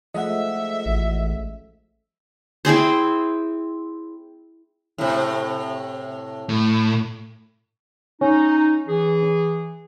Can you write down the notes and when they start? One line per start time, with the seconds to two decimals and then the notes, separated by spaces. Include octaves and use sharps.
0.14 F3 G#3 A3 D#5 E5 F#5
0.85 A1
2.65 C4 E4 G#4 C5
4.98 A2 C3
6.49 A2
8.21 C#4 D#4
8.88 E3 G#4